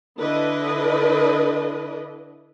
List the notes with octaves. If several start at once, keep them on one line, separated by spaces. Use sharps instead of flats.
D3 D4 E4 B4 D#5